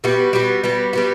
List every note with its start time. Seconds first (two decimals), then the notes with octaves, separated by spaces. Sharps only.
0.04 G3 B3 F#4
0.33 G3 B3 F#4
0.64 G3 B3 F#4
0.93 G3 B3 F#4